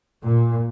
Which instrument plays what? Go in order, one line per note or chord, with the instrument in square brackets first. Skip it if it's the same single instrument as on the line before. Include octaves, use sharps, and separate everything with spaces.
[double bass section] A#2